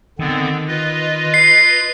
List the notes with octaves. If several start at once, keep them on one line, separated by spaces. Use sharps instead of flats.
D3 D#3 B3 C4
F4 B4 D#5
C7